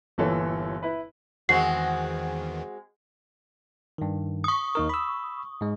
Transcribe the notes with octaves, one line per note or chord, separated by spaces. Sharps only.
G1 A#2 E3 A4 C#5
E4 B4
E2 D#3 E3 G#3 C4 F#4 C7
G2 D#3
C#6 D#6
D#2 D#4 A#4
B5 E6
G#2 G#3